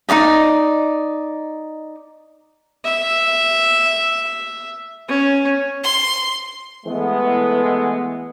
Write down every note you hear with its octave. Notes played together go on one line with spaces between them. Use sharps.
D#4 F4 D5 D#5
E5
C#4
C6
E3 G#3 A3 B3